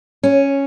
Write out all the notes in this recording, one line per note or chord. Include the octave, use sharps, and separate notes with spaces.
C#4